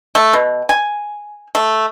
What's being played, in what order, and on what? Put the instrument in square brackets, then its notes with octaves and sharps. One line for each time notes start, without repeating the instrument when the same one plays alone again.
[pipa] A3
B2
G#5
A3